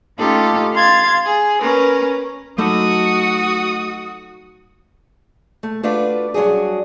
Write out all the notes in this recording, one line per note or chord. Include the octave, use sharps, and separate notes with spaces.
A3 C#4 D#4 F4 G4 A4
F5 C6 G#6 A6
G#4
C#4 A#4 B4
F#3 A3 D#4 F#4 A4 D#6
A3
A3 D4 F4 F#4 B4 D5
G2 F#3 D4 F#4 G#4